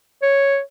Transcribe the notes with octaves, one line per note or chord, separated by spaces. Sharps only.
C#5